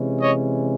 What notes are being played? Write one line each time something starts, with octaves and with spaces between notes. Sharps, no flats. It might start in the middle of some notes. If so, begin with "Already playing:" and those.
Already playing: C3 E3 G#3 C#4
C#5 D#5